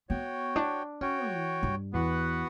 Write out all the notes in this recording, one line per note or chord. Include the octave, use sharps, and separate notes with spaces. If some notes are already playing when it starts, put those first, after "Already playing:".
B3 F#4 C#5 G5
D4
C#4 F#4 C#5 G5
E3
G2
E2 B3 F#4 B4 F#5